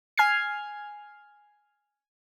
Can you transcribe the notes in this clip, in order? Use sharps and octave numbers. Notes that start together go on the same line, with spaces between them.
G#5 F6 G#6 C7